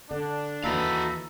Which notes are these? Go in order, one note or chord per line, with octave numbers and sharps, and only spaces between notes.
D3 D4
D#2 E3 D#4 F#4 A4 F5 B5